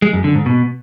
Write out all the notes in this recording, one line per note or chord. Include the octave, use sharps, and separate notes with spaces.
G#3
F#2
D3
G#2
B2